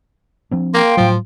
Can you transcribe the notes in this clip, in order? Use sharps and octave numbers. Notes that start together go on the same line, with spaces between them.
F3 C4 D4
A#3 F5 G5 C6
A2 F3 F#3